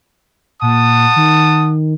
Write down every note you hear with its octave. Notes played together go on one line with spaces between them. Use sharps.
A#2 F#5 A5 D#6
D#3